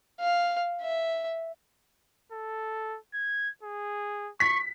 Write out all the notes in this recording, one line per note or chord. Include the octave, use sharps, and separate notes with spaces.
F5
E5
A4
G#6
G#4
C#6 B6